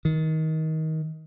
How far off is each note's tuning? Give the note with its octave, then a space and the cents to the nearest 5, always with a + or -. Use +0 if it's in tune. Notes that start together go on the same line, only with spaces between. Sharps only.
D#3 +25